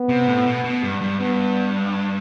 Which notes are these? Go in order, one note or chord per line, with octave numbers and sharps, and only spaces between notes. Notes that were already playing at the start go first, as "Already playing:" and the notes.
Already playing: B3
C3
A2
B2
B2
G2
G2
G2 B3